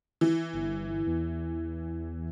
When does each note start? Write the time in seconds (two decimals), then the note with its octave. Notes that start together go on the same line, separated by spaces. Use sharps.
0.21 E3
0.53 G1
1.07 E2